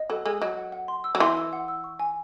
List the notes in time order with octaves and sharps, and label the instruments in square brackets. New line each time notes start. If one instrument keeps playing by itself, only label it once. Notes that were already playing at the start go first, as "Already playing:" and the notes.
Already playing: [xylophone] D#5
[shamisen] F#3 [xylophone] A4
[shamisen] G#3 [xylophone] A4
[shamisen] F#3 [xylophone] D#5
[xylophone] F#5
F#5
C6
E6
[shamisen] F#3
[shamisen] E3 [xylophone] C6
[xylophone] E6
F#5
E6
C#6
G#5